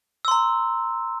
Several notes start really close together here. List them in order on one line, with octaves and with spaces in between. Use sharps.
E6 C6 A#5